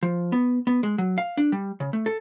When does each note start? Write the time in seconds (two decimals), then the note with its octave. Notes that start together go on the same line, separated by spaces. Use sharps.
0.03 F3
0.32 B3
0.67 B3
0.83 G#3
0.98 F#3
1.18 F5
1.37 D4
1.52 G3
1.80 C#3
1.93 A3
2.06 A4